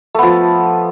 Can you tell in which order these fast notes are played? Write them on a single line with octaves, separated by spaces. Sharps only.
A3 B3 F3